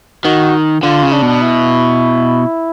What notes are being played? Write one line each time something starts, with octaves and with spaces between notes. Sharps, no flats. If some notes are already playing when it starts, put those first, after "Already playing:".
D#3 F#4
D3 F4
C#3
D4
B2
E4